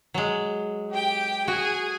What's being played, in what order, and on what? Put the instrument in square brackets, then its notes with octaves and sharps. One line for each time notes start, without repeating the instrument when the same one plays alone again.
[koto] F#3 G#3
[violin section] G4 G5
[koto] F#4 [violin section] G#4 G#5